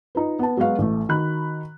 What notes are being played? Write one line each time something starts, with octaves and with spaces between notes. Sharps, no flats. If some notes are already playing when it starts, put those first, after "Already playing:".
D#4 F4 B4
B3 A5
F#3 G#3 B3 F#4 F5
A1 A3
D#3 F#4 B5 F#6